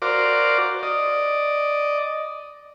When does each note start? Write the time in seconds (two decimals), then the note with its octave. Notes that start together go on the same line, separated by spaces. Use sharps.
0.02 F#4 A#4 C5 D5 F5 D6
0.83 D5 D#5